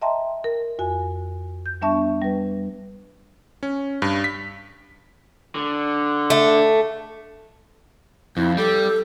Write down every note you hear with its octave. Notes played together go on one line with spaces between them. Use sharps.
D#5 E5 G5 A5 A#5 C6
A#4
F2 F#4 G#5
G6
G3 B3 D4 E5 A5 C#6
G3 B4
C#4
G2
B6
D3
A3
F2 E4
G3 A4